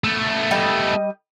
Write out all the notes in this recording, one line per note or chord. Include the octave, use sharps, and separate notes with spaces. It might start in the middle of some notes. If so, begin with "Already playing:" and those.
A3 B3
G3 D#5